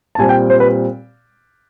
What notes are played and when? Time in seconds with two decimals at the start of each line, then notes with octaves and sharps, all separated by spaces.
0.15 A5
0.18 A#2 G3 C4 G#5
0.29 G5
0.50 C5
0.60 B4